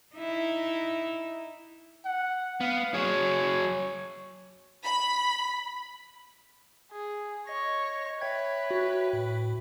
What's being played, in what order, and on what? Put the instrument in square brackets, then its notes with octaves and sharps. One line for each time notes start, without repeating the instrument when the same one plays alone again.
[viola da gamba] D#4 E4
[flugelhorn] F#5
[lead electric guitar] B3 [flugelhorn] F5
[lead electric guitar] F#3 G#4 [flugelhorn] C#5
[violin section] B5
[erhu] G#4
[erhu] C#5 [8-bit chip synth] D#5 A#6
[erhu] B4 [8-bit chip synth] C#5 E5 G5 [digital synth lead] G#6
[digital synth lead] F#4
[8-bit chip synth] A2